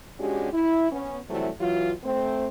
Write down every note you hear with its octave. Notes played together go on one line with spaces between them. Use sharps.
G#3 C#4 D4 F#4 G4
E4
B3 C#4
C3 E3 F#3 G3 A3 E4
E3 F#3 F4
A3 C4 C5